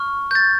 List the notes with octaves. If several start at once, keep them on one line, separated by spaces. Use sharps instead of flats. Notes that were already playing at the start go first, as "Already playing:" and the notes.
Already playing: C#6 F6
G6
A6